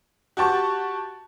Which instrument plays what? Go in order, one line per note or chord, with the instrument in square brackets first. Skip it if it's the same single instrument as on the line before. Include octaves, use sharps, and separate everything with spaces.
[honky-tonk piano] F#4 G4 A5 C#6